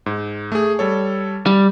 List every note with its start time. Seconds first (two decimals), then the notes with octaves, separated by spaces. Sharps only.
0.06 G#2
0.52 A3 G#4
0.79 G3 A4 C#5
1.46 G3